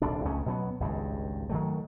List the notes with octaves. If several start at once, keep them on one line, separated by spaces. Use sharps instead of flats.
D#1 C2 D4
C#2 A3 C#4
B2 F#3 A#3 B3
G#1 C#2 G2
D#3 F#3 A3